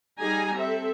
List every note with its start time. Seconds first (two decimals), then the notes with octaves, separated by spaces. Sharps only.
0.19 G3 D#4 G4 G#4 G#5 A#5
0.57 C4 A4 E5